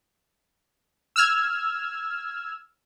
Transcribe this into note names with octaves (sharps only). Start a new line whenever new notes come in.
E6 F6 G#6